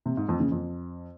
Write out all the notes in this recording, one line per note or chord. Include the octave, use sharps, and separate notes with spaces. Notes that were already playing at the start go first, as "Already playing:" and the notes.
C3
G#2
F2
C#3
F2